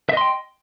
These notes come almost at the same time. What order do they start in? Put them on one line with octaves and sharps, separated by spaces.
E5 D#5 C6 G5